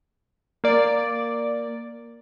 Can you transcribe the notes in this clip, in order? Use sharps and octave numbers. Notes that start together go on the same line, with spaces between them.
A#3 D5